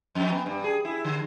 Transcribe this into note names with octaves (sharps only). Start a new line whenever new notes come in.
F2
B3
G2
G#4
E4
D3